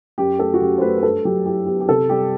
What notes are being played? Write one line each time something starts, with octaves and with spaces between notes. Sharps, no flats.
F#2 G4
A3 A4
F#4
F#2 G4
C5
A3 B4
B4
G2 A4
F#3 G4
E4 G4
B3 G4
G4
C3 A4
G3 G4